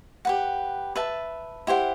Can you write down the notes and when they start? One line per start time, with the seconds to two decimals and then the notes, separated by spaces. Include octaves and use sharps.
0.25 G4 B4 F#5
0.96 B4 E5 A5
1.67 E4 G4 C5 F#5